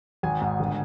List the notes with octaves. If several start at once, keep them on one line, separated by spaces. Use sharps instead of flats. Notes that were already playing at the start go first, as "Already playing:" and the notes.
G#1 G#5
G#2
G1